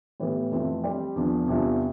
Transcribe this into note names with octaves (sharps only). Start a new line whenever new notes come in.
A2 E3 B3 E4 G4
F2 E3 A3 C4
G3 C4 G4 D5
E2 D3 F3
E2 C3 G3 D4 F4